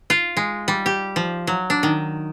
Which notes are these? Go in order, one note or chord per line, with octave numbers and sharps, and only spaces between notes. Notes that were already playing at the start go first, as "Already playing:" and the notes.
F4
G#3
G3
G4
F3
F#3
D4
D#3